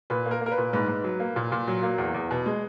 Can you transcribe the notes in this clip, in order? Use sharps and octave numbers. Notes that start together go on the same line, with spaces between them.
A#2 B4
A#3
A#4
A#3
A#4
B4
A#2
G#2 B4
G#2
F#3
A#3
A#2
A#2
F#3
A#3
E2
E2
B2
G#3